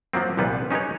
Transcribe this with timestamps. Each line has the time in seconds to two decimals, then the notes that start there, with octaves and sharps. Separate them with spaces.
0.13 F3 F#3 A#3 C4
0.37 C2 A#2 G3 B3 B4
0.70 C#4 D#4 G4 B4 C#5